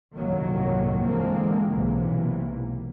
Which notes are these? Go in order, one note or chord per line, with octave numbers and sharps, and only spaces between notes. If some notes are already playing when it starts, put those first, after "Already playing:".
G1 C2 A2 D#3 F#3 A#3
D3 E3 F3 G#3 A#3 C4
B1 G#2 C3 E3 A#3